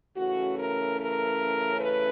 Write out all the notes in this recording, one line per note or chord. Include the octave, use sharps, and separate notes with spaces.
C#3 E3 A3 C#4 F#4
A#4
A#4
B4